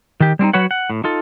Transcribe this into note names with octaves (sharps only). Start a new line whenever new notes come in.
D#3 G4
G3 C4 C#4 D#4
F#3 F#4 B4 C#5 F#5
F#5
A2
D#4 F4 A4